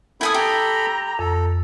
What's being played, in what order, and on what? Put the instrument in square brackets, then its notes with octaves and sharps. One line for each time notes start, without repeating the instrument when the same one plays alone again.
[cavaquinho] E4 G#5 D#6 [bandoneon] A4 B5
[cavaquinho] G4 [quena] A#5
[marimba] F2 [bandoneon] A4